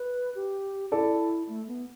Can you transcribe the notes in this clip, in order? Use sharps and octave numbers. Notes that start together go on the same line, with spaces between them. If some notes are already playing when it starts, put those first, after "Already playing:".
Already playing: B4
G4
E4 A4 D5
A3
B3